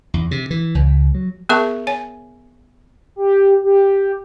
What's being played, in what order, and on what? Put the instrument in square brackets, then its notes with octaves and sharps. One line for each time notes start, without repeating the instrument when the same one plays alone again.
[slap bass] E2
C3
E3
C#2
F#3
[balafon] B3 G#4 A#4 E5 A5 C#6
C#5 G#5
[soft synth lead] G4
G4